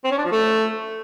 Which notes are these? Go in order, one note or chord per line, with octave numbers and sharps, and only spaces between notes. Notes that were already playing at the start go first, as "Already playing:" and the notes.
C4
C#4
D4
F3
A3